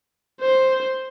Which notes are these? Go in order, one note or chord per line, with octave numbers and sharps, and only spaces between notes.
C5